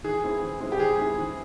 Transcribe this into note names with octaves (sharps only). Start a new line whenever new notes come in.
E3 G#4
G#3 C4 E4
E3
G#3 C4 E4
G4
E3 G#4
G#3 C4 E4
E3